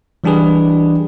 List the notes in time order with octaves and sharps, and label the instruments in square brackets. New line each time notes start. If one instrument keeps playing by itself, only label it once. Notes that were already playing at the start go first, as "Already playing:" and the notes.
[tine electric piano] E3 G3 D4 G4 G#4 B4